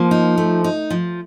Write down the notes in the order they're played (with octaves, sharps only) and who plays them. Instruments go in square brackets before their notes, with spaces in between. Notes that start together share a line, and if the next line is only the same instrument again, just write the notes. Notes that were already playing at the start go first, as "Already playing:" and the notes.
Already playing: [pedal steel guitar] F3 [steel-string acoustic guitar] A#3
[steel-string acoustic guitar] D#4
A3
D#4
F3